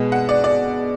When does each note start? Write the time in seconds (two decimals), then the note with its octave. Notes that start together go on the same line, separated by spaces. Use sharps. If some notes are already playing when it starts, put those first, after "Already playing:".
Already playing: B2 G#3 B3
0.12 F#5
0.29 D5
0.44 D5